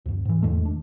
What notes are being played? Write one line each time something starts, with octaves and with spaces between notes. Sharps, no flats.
D2 G2
G#2 E3
E2 D#3 G#3 A3
D4